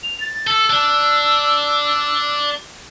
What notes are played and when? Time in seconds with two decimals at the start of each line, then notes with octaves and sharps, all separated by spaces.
0.03 F7
0.21 A6
0.47 A4 E6
0.70 D4